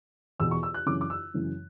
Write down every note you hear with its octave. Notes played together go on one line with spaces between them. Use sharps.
E2 B2 E6
C#6
E6
F#6
F#2 C#3 E3 D6
D6
E6
F#2 C#3 E3